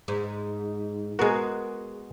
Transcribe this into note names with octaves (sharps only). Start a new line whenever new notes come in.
G#2
G#3 B3 F#4 G#4 A#4